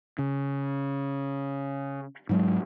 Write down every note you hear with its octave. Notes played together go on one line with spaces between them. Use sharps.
C#3
G#2 F#3 G#3